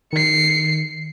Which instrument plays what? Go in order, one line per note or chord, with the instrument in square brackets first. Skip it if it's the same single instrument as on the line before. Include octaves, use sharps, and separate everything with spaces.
[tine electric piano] D#3 [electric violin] C7 C#7